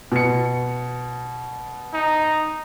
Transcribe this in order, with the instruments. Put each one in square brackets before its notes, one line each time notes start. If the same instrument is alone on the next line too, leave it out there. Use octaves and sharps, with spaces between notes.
[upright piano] B2 C#7
[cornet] D#4